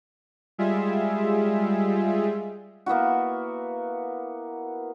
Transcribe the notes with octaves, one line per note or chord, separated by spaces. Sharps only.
G3 G#3 F4 G#4 E5
A#3 B3 E4 F#4